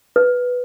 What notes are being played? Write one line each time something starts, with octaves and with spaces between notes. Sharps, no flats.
B4